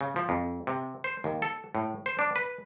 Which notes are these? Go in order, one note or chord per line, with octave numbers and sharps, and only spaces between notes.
C#3
F3
F2
C3
C5
D#2
A4
A2
C5
D4
B4